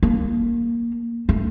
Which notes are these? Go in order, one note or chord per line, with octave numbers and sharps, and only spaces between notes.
A#3
A3